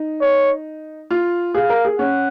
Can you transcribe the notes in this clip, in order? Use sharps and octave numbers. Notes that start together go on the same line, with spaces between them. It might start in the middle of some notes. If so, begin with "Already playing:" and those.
Already playing: D#4
C#5
F4
G#4 F5
A#4
G#4
C#4 F#5